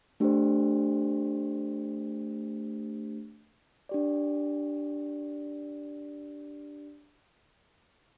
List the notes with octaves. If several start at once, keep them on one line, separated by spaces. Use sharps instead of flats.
A3 D4 G4 C5
D4 G4 D5